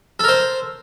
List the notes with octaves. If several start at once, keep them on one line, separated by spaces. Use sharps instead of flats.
A4 A#4 C5